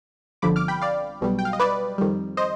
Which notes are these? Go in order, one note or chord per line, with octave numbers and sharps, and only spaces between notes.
G1 F2 D3 F3 B5 D6
D6 F6
G5 B5
D5 F5
B1 B2 G3
G5
F5
D#5
B4 D5
F2 D#3 G3
C5 D#5